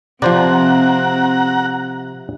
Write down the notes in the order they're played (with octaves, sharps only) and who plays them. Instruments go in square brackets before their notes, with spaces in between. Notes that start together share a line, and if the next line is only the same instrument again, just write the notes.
[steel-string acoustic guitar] C3 [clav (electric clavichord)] F3 C5 D5 [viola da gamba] C4 [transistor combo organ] F#5 A#5